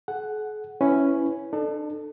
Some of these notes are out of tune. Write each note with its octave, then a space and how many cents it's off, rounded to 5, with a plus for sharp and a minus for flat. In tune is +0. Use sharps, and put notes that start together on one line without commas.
G#4 +45 F#5 +5
C#4 +0 E4 +0 B4 +15
D4 +45 A4 +0